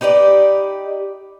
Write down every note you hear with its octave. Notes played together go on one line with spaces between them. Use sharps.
D#4 G4 B4 D5